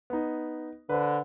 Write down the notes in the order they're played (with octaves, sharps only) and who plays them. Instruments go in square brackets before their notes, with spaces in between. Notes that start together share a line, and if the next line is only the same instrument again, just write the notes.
[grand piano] B3 D#4
[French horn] D3 [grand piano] B4 C5